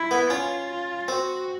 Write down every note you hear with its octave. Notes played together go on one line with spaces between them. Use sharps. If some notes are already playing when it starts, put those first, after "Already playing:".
Already playing: E4
B3
C#4 F4
F4
C4 F#4